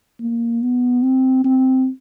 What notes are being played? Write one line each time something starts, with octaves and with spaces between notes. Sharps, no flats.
A#3
B3
C4
C4